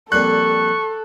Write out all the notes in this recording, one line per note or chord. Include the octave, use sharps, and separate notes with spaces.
F2 A#2 G3 A4 C#6 F#6